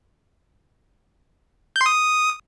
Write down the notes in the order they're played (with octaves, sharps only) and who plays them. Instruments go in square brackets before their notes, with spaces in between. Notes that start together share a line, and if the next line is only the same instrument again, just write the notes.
[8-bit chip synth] G6
C6
D#6